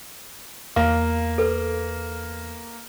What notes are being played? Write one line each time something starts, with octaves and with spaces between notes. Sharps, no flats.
E2 A#3 F5
A4 B4